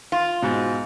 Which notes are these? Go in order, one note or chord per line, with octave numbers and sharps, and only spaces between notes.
F4
G#2 B2